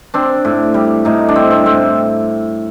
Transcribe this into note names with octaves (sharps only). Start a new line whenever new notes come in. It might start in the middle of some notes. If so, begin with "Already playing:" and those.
C4 D4
A2
G3
A2 D#4
D4
C4
C4
A2 C4